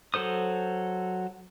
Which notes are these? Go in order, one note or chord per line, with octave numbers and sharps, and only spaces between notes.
F#3 A4 C5 D#6